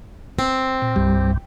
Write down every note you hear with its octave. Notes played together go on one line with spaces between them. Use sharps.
C4
A#2
C2 G2 G3